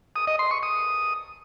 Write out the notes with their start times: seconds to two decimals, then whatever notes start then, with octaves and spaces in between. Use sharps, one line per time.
0.16 D#6
0.27 D#5
0.39 C6
0.51 C#6
0.63 D#6